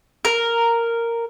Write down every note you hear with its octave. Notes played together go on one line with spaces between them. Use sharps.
A#4